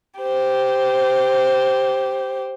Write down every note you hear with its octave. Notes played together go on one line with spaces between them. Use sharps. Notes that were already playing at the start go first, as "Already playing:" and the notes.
G4 C5